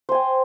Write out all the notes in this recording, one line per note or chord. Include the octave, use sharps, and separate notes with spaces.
C5 G5 G#5